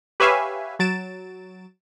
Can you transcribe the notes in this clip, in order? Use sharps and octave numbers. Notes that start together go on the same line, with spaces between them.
G4 B4 C#5 E5 F5 G#5
F#3 A6 D7 E7